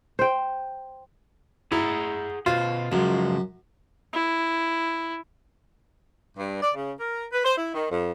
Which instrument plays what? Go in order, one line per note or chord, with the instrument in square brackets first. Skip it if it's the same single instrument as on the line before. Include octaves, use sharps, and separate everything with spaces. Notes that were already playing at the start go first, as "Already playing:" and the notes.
[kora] C5 G5
[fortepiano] E4 [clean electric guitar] G#4 F#5 A#5
[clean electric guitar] B2 C5 [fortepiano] F4
[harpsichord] F#2 [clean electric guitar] C#3 F3 G#3
[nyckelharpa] E4
[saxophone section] G2
D5
C#3
A#4
B4
C5
E4
D#3
F2